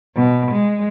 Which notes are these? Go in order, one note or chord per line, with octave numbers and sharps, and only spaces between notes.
B2
G#3